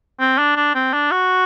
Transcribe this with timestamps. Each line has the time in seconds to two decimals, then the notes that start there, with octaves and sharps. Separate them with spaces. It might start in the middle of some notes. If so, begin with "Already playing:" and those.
0.20 C4
0.38 D4
0.56 D4
0.75 C4
0.93 D4
1.11 F#4